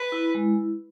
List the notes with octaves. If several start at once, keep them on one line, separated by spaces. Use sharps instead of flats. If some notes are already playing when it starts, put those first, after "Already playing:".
Already playing: B4
E4
G#3